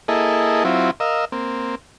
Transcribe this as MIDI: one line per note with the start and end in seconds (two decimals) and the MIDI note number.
0.08 0.64 58
0.08 0.64 64
0.08 0.64 68
0.08 0.64 69
0.08 0.64 75
0.65 0.91 54
0.65 0.91 60
0.65 0.91 64
0.65 0.91 65
1.00 1.25 70
1.00 1.25 75
1.00 1.25 77
1.00 1.25 88
1.32 1.75 58
1.32 1.75 60